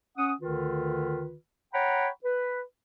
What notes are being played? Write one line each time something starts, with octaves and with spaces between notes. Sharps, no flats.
C#4 F#5 D#6
D2 D3 D#3 F4 B4
C#5 F#5 G5 A#5 B5
B4